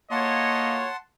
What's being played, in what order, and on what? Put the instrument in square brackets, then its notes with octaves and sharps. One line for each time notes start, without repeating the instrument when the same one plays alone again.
[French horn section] A2 F4 C#5 [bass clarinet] A#3 [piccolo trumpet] D#5 [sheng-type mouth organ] F#5 A5 C6